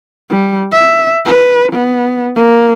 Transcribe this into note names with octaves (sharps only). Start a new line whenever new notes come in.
G3
E5
B4
B3
A#3